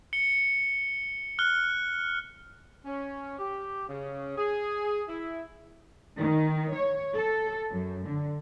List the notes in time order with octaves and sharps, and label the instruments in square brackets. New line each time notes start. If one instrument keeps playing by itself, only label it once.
[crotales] C#7 G7
F6 F#6 G7
[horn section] C#4
G4
C#3
G#4
E4
[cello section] D#3
C#5
A4
F#2
D3